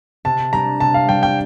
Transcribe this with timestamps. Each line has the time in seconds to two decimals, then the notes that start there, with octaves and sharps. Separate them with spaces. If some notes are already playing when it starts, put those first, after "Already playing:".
0.25 C3 A5
0.53 G3 D4 A#5
0.80 C3 A5
0.94 F5
1.09 G3 D4 G5
1.23 G5